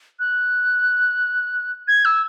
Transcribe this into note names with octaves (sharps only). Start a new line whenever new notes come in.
F#6
G#6
E6